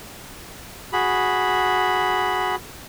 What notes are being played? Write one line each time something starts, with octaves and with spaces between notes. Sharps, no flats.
F#4 G#4 B5